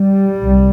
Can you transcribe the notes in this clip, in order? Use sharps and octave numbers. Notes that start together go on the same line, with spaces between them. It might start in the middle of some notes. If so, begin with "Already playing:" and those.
Already playing: G3
C2